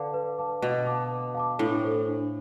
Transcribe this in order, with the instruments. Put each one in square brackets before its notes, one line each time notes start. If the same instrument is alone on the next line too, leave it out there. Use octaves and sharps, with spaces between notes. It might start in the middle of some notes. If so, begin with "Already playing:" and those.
Already playing: [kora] D3 [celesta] B4 F5 A5 D6
[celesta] B4
F5 A5 D6
[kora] B2 [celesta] B4
[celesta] F5 A5 D6
B4
F5 A5 D6
[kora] A2 [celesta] D4
[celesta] A4 C5
D4